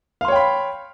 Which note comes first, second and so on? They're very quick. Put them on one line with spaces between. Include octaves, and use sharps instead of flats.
F5 C6 C#5 G5 B5